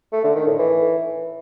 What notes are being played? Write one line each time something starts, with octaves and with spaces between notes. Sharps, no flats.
A3
D3
D#3
A2
E3